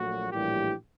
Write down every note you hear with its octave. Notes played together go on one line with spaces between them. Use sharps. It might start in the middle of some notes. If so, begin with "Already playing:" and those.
Already playing: A#1 A#2 F#3 A3 F#4
A#1 A2 E3 G3 A#3 G4